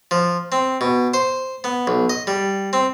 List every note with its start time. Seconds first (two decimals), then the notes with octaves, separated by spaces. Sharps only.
0.11 F3
0.52 C4
0.81 B2
1.14 C5
1.64 B3
1.87 B1
2.10 D#5
2.27 G3
2.73 C4